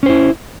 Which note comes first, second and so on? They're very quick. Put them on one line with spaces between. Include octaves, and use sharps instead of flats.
C#4 C5 E4